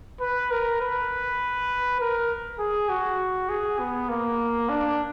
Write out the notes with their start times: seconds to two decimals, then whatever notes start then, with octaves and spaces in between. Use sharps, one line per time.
0.21 B4
0.51 A#4
0.81 B4
2.00 A#4
2.59 G#4
2.89 F#4
3.49 G#4
3.79 B3
4.09 A#3
4.69 D4